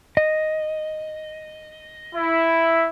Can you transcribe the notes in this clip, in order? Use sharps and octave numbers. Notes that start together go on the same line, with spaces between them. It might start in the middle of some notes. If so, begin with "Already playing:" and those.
D#5
E4